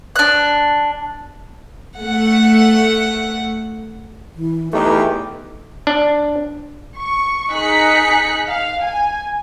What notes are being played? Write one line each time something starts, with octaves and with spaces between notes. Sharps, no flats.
D4 F#6
A3 F#5
E3
E2 A3 D#4 G4 B4
D4
C#6
D#4 G#4 F#6 B6 C#7
F5
G#5